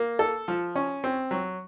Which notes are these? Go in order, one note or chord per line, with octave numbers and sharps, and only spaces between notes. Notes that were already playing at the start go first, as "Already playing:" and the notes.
Already playing: A#3
A4
F3
C#4
C4
F#3